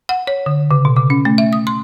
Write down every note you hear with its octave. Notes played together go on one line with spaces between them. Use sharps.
F#5
C#5
D3
C#3
B2
C#3
C#4
A3
E5
D#6
C6